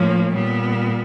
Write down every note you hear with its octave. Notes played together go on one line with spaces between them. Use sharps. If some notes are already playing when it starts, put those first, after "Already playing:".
Already playing: A2 F3 A#3 C#4
A#2 G3 B3